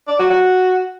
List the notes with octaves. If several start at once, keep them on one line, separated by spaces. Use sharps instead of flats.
D5
F#4
F#4